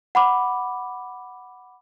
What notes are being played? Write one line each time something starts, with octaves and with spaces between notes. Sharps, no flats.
F#5 B5 D6